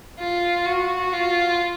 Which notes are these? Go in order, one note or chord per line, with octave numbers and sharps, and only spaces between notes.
F4
F#4
F4